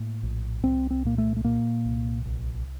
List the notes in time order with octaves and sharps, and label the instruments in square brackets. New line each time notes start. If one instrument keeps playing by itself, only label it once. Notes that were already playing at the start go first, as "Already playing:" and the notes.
Already playing: [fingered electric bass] A2 A#3
A#1
C2 C4
C4
A#2 A#3
A3
A3
A#2 A#3
C2
A#1